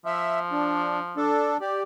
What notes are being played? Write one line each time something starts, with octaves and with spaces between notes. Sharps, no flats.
F3 E5
D4
D4 A4
G4 D5